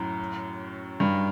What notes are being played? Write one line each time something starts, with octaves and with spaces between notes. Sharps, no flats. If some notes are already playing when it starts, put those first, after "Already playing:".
Already playing: F#2 A2
G2